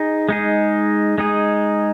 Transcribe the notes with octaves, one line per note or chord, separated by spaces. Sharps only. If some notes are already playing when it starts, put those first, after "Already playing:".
Already playing: D#4 G#4
G#3 D#4 G#4
G#3 D#4 G#4